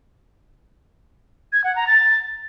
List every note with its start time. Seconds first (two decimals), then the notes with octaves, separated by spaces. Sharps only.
1.53 G#6
1.64 F#5
1.76 A#5
1.87 A6